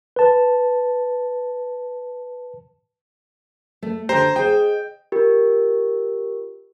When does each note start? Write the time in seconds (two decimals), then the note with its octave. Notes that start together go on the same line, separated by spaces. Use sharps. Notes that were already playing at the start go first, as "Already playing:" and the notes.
0.16 B4 A5
3.82 A3
4.09 D3 G4 C5 A#5
4.36 G#4 C5 D#5 G5
5.12 F4 G4 A#4